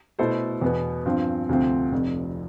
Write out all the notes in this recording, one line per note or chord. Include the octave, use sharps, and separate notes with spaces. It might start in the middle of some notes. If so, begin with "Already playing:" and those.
B2 A3 E4 A4 C5
E2 B2 B3
G2 F3 C4
D2 C3 F3 C4
F1 F2 C3